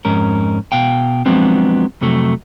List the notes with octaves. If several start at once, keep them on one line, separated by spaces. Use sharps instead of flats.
F2 G#2 C#4 A#4
B2 F5 G5
F3 F#3 G#3 B3 C4 D4
F2 C3 F#3 A3